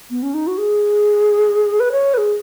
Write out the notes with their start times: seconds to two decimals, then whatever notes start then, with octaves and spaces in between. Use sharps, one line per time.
0.10 B3
0.23 C#4
0.34 D#4
0.47 F#4
0.58 G#4
1.80 B4
1.92 C#5
2.14 B4
2.18 G#4